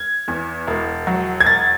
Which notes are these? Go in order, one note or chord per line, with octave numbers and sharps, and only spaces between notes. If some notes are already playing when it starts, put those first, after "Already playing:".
Already playing: G#6
E2
E1
F#3
G#6
E1 A6